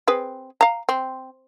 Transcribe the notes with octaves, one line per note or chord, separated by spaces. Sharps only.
C4 G#4 B4
F5 A#5
C4